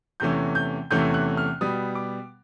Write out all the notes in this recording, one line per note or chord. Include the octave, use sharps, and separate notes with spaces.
E2 C3 E3 A3 C#4 G6
G6
E2 C3 E3 A3 C#4 G6
F#6
F6
B2 G3 B3 D#6
D6